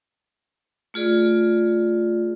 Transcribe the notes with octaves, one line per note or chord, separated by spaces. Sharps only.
A3 F4 G#4 D5